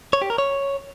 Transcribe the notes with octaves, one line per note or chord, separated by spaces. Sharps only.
C#5
G4
A#4
C#5